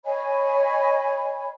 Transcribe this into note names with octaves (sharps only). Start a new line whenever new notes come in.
C#5 D#5 G#5 B5